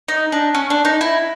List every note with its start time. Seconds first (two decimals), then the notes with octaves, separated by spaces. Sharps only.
0.08 D#4
0.32 D4
0.55 C#4
0.70 D4
0.85 D#4
1.01 E4